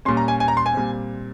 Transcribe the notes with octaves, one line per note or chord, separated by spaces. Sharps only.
A#2 G3 C#4 C6
A#5
G#5
G#5
A#5
C6
G#5
A#2 G3 C4